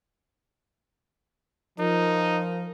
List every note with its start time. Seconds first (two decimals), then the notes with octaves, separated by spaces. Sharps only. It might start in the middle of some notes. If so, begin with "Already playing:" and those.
1.79 F3 D#4 A#4